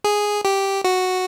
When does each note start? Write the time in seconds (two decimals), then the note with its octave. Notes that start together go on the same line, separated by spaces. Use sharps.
0.04 G#4
0.45 G4
0.84 F#4